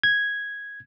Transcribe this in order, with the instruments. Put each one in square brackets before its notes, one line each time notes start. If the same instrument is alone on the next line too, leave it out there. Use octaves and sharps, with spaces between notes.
[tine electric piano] G#6